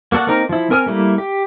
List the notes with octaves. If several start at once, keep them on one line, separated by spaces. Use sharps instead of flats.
A#3 F#4 A4 D5 F#5
A#3 C4 D#4 A#4
F3 E4
C4 A#4 G#5 D#6 F6
G3 A3 A#3 E4
G4